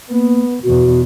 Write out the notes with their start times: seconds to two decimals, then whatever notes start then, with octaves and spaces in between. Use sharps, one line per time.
0.10 A#3 B3
0.64 E2 B2 F#4